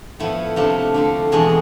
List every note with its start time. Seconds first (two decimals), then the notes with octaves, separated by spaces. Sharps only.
0.20 A2 F3 B3 E4
0.56 C3 F3 A3 D4 F4
0.94 D3 A3 C4
1.32 E2 B2 G#3 D4 G#4